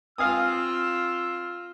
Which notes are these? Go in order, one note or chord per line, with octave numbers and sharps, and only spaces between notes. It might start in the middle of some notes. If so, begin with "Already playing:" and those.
C4 F4 F5 G#5 D#6 E6